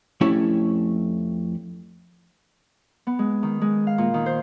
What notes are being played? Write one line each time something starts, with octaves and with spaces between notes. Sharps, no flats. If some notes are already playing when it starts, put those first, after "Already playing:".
F2 A3 C#4 E4 G4 C#5
B3
G#3
D#3
G#3
F5
A#2
D#3
C5